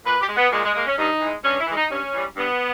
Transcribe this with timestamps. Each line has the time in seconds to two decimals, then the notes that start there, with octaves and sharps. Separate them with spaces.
0.06 A#2 B4
0.21 G4
0.29 G#3
0.37 B3
0.52 A#2 G#3
0.64 G#3
0.75 G#3 A#3
0.87 C#4
0.98 G2 D#4
1.21 E3 G#3
1.44 G2 C#4
1.60 E4
1.67 E3 G#3
1.76 D#4
1.91 G2 C#4
2.14 E3 G3
2.36 G2 B3